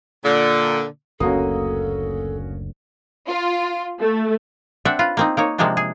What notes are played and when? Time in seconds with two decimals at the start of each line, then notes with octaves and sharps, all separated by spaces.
0.24 A#2 D3
1.20 F#1 D2 A#3 C#4 F#4 A4 D#6
3.28 F4
4.00 A3
4.85 C4 D4 E5 F#5
4.99 F4 B4
5.17 A#3 C4 D#4
5.37 A#3 D#4 C#5
5.58 C3 F3 G#3 A#3 C4 D4
5.77 G#4